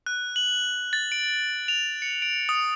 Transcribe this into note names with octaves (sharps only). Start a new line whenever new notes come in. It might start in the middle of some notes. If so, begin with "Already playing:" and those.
F#6
F#7
A6
D7
F7
C#7
D7
D#6